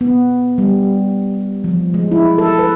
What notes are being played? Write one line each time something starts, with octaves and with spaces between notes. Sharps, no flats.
B3
G3
F3
G#3
E4
A4
B4